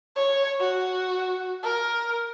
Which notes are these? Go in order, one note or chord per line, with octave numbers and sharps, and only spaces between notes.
C#5
F#4
A#4